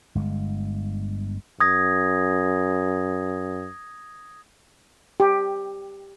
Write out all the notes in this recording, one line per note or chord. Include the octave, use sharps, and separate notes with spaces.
G1 G#3
F#2 D#6 G#6 A#6
G4